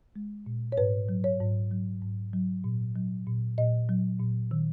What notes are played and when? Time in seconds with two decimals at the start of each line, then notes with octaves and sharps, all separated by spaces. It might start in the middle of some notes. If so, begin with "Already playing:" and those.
0.16 G#3
0.46 A#2
0.72 C#5
0.78 G#2 B4
1.09 F#3
1.24 C#5
1.40 G#2
1.71 F#3
2.02 G#2
2.33 F#3
2.64 A#2
2.96 F#3
3.26 A#2
3.58 A#2 D#5
3.89 F#3
4.20 A#2
4.51 D#3